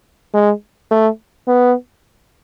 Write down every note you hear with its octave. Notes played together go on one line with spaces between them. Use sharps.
G#3
A3
B3